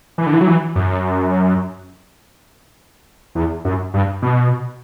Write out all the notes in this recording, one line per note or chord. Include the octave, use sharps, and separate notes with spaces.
E3
D3
E3
F#3
E3
F#2
E2
F#2
G2
B2